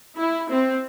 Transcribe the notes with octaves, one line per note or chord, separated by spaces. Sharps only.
E4
C4